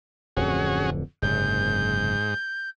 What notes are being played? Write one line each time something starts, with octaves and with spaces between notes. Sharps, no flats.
D1 F2 D3 C#4 F#4 G#4
F#1 G#2 C3 G6